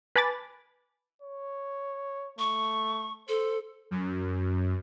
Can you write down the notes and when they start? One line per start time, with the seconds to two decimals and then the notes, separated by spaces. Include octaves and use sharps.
0.16 B4 G#5 A5 B5 D6 A6
1.22 C#5
2.39 A3 C#6
3.29 A4 C5
3.91 F#2